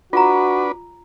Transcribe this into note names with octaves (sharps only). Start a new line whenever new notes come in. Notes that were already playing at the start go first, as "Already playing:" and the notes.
D4 F4 F#4 B4 A#5